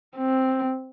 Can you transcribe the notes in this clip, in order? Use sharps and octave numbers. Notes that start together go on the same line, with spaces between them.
C4